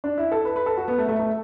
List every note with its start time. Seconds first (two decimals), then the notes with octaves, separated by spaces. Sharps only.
0.04 D4
0.18 E4
0.32 A4
0.45 B4
0.56 B4
0.66 A4
0.77 F#4
0.88 B3
0.98 A3
1.09 A3
1.19 A3